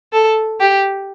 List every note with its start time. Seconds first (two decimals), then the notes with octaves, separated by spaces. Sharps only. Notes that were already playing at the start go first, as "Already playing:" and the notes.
0.13 A4
0.60 G4